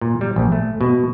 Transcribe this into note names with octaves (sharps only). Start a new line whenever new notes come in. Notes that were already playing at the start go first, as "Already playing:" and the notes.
A#2
G3
A#1
A3
B2